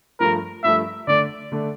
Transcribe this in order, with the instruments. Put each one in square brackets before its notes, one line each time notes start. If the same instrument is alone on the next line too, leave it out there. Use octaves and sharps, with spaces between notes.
[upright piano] G2 F3 A3 [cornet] A#4
[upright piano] G2 F3 A3 [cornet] E5
[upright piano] D3 A3 D4 [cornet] D5
[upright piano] D3 A3 D4